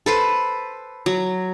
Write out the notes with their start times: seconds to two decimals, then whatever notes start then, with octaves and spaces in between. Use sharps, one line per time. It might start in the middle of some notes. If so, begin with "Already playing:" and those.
0.06 A4 B4 C5
1.06 F#3